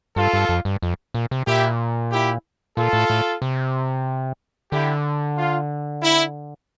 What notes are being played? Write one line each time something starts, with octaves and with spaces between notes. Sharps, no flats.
G2 F4 A4
G2
F2
G2
F2
A#2
C3
A#2 E4 G4
E4 G4
A#2 F4 A4
A2
A2
C3
D3 E4 G4
F4
E4